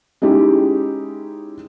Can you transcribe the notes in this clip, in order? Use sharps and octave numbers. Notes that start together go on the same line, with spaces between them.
G#3 C#4 D#4 E4 G4 G#4